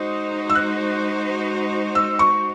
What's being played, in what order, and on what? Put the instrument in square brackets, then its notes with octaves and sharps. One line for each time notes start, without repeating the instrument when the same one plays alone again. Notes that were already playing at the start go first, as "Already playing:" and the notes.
Already playing: [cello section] G#3 D#4 F#4 C5 [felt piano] D#6
[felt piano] E6
F#6
E6
C#6